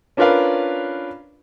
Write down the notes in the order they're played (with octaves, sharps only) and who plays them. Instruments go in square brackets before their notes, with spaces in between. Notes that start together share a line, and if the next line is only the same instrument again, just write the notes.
[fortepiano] C#4 D4 F4 A#4 B4 F5